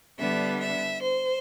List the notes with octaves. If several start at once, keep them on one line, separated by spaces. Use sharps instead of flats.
D3 G3 B3 D4 E5
E5
C5